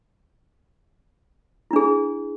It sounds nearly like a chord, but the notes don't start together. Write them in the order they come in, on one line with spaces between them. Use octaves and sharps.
E4 D4 G#4